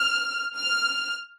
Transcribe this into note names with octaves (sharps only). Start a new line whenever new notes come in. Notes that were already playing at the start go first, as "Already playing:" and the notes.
Already playing: F6
F6